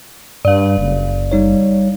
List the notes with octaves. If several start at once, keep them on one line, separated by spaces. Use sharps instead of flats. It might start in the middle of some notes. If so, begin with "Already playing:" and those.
G2 D5 F5
F#1
G3 D#4 C#5